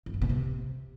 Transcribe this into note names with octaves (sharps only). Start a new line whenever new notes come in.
F2
A2
B2
C3